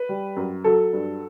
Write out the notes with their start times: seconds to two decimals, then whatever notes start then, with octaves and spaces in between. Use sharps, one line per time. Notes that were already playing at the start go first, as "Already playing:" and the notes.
Already playing: B4
0.09 G3
0.36 F#2
0.64 F#3 A4
0.93 G2